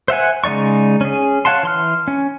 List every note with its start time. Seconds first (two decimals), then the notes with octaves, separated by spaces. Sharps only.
0.08 C5 E5 F#5 G#5
0.44 C#3 G#3 D#4 D5 C#6
1.01 C#4 G#4
1.45 C#5 F5 F#5 A5 C6
1.63 E3 C6 F6
2.08 C#4